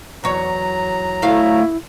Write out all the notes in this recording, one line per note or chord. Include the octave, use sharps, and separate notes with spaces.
E2 F#3 C#5 A#5
D2 A3 E4 F5